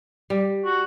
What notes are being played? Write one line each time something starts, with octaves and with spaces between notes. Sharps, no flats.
G3
F#4